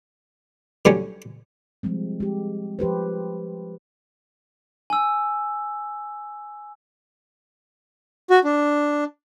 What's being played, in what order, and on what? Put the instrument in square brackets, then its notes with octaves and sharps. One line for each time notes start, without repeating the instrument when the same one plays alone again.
[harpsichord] D3 F#3 G3 C#4
[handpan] F3 G3 G#3 C4
G#3 G4
F3 G4 B4 C5
[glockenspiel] G#5 E6
[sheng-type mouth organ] F#4
D4